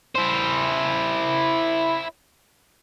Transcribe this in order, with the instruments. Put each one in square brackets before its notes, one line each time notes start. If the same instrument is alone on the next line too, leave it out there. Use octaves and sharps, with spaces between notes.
[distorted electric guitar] E4 C5